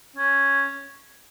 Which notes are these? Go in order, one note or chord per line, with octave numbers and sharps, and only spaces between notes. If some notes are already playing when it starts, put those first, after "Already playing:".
C#4